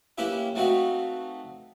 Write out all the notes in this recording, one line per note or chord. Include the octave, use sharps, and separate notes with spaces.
A#3 C#4 E4 G4 B4 E5
A3 C4 D#4 F#4 B4 F5